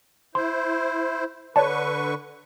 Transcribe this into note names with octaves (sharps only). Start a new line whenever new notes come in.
E4 C5 C6
D3 B4 C#5 D5 A5 C#6